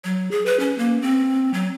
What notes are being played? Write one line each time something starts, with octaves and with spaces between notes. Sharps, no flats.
F#3
G#4
B4
C#4
A#3
C4
F#3